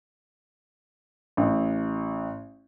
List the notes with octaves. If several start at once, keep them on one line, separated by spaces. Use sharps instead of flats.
A1